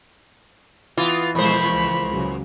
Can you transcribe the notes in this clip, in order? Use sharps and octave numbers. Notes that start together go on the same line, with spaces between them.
E3 B3 F4
E2 B2 F3 G#3 A#3 C5 B5
C#2
C#3 F#3